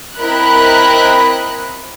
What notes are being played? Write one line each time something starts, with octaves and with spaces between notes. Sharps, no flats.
C4 E4 A#4 D#5 B5 F#6